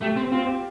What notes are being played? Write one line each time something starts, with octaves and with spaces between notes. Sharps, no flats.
A3 G4
C4
C4 F4
G4